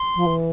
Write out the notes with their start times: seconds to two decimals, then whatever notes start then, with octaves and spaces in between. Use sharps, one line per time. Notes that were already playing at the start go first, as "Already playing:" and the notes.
Already playing: C6
0.16 F3
0.26 E3